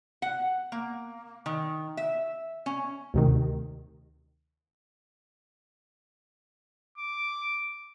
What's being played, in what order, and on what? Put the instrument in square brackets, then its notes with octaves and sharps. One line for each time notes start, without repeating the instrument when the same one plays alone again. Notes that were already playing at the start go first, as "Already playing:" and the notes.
[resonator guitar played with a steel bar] F#5
A#3
D#3
E5
C#4
[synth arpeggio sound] D2 C3 D#3
[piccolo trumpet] D6